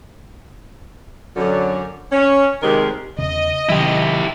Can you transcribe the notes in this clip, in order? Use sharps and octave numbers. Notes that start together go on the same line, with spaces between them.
F#2 D3 F#3
C#4
D#2 C3 D#3 G3 G#3 A#4
E2 C#3 D#5
C3 D#3 F#3 E4 G4